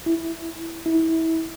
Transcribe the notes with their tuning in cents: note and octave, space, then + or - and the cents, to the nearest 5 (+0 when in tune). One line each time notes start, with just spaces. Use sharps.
E4 +0
E4 -25